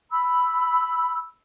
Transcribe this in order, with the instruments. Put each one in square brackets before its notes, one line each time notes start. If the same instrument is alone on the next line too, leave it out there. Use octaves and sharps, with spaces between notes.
[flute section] B5 E6